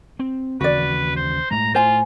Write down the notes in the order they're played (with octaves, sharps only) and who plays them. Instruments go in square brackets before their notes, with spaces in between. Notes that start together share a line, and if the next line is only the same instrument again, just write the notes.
[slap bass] C4
[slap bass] D#2 C#3 E3 [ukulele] F#4 D5 [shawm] B4
[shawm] C5
[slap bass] A2 G#3 [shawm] A#5
[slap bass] A2 [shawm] F4 [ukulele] C5 G#5